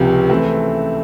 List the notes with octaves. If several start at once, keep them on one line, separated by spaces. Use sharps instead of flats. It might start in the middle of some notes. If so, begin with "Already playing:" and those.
Already playing: C#2 C3 F3
E3 A3 C4